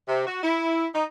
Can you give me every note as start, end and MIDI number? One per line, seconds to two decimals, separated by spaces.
0.08 0.25 48
0.26 0.42 66
0.43 0.86 64
0.94 1.03 63